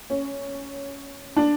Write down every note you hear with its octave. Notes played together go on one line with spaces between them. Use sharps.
C#4
D4